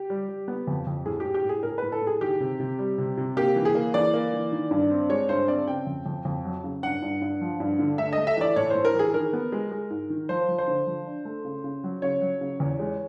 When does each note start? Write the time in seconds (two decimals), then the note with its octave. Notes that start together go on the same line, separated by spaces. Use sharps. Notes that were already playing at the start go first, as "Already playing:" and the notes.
Already playing: G4
0.10 G3
0.29 G3
0.48 B3
0.67 F2
0.87 F2
1.06 A2 G#4
1.20 A2 G4
1.34 G4
1.44 A2
1.49 G#4
1.63 A2 A#4
1.78 A2 B4
1.92 A4
2.02 A2
2.07 G#4
2.21 D#3 G4
2.40 C3
2.60 C3
2.79 G3
2.98 C3
3.17 C3
3.37 A#3 G4
3.56 E3
3.65 G#4
3.75 A#3
3.94 E3 D5
4.14 A#3
4.33 E3
4.52 D#3
4.71 G2
4.90 C4
5.10 G#3 C#5
5.29 G2 C5
5.48 C4 D5
5.68 C#3 G5
5.87 F2
6.06 F2
6.25 F2
6.45 F#3
6.64 C#3
6.83 G2 F#5
7.02 G2
7.21 G2
7.41 F3
7.60 G2
7.79 D3
7.98 A3 E5
8.13 D#5
8.18 A3
8.27 E5
8.37 E3 D5
8.56 A2 C#5
8.70 A2 C5
8.85 A#4
8.95 E3 G#4
9.14 D#3 A#4
9.33 B3
9.52 G#3
9.71 G#3
9.90 G#2
10.10 D#3
10.29 F3 C5
10.49 F3
10.58 C5
10.68 D3
10.87 F3
11.06 D4
11.25 A3
11.44 C#3
11.64 C#3
11.84 F#3
12.02 C#3 C#5
12.21 F#3
12.41 C#3
12.60 E2
12.79 G#3